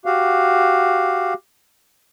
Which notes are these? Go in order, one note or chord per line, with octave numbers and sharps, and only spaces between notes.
F#4 G4 F5